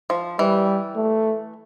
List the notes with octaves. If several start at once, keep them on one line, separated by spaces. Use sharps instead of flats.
F3
E3 G3
A3